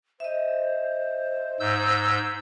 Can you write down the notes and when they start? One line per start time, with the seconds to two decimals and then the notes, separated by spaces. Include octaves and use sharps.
0.20 C5 D#5 E5
1.60 G#2 E6 G6